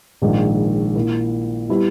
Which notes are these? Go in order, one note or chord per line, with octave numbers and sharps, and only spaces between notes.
A#1 G#2 D#3 G#3
A#2 A#3 E4
G3 B3 E4